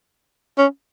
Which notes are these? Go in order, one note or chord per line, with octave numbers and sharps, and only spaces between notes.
C#4